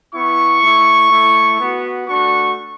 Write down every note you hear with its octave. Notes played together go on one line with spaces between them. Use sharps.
B3 E4 C#6
A3 E4
A3 E4
B3 F#4
A3 D4 F#4 C#6